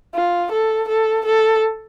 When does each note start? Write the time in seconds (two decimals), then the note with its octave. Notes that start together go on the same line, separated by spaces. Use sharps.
0.15 F4
0.51 A4
0.88 A4
1.25 A4